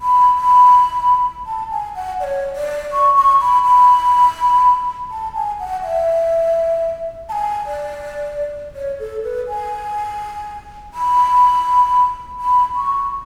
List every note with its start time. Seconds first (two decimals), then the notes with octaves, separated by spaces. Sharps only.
0.01 B5
0.38 B5
1.46 A5
1.71 G#5
1.95 F#5
2.20 D5
2.24 C#5
2.56 D5
2.93 C#6
3.16 C#6
3.41 B5
3.65 B5
5.11 A5
5.35 G#5
5.60 F#5
5.84 E5
7.29 A5
7.32 G#5
7.66 D5
8.75 C#5
9.00 A4
9.24 B4
9.48 G#5
10.94 B5
12.40 B5
12.76 C#6